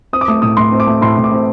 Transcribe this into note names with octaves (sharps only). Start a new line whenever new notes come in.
C4 D#6
D6
A3 D#6
A2 D#6
A2 C6
C4
D6
A3
A2 C6
A2
D6
C4